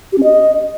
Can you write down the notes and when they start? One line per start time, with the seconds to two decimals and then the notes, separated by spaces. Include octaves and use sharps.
0.12 G4
0.18 C#4
0.23 D#5